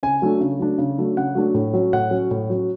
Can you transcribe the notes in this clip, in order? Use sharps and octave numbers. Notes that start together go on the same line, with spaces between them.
C#3 G#5
F#3 A3 D4
C#3
F#3 A3 D4
C#3
F#3 A3 D4
C#3 F#5
F#3 A3 D4
A2
F#3 C#4
A2 F#5
F#3 C#4
A2
F#3 C#4